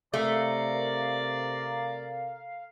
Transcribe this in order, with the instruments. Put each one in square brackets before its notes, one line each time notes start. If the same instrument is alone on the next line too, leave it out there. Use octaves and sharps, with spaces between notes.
[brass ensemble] C3 A#4 A#5 [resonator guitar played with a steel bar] A3 [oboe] D5 [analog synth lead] F5